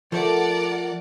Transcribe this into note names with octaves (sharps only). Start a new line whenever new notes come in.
F3 A3 A#4 D5 F#5